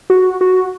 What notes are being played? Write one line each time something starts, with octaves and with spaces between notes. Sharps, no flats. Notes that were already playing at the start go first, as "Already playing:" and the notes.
F#4
F#4